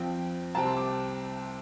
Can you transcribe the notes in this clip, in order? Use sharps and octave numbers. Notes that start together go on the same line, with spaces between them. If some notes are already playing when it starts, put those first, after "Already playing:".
Already playing: F2 F3 C4 G5
C2 C3 G3 C4 A5
C6
D6